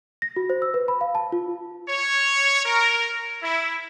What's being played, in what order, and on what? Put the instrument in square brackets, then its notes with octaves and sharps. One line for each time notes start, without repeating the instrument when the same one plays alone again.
[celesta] A#6
F#4
C5
E6
B4
B5
F5
A5
F4
[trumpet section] C#5
A#4
E4